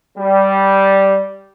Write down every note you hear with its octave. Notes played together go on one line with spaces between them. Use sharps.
G3